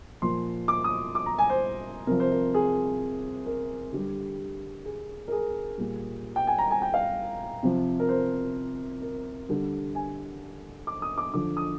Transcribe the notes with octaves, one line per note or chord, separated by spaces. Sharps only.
A#2 F3 C6
D6
D#6
D6
A#5
G#5
C5
C3 F3 A#4
C5
A#4
G#4
A#4
D3 G3 G4
G#4
A#4
G#4
A#2 G3
G5
G#5
A#5
G#5
G5
F5
C3 F3
A#4
C5
A#4
D3 G3
G#5
D6
D#6
D6
D3 F3 D6
D#6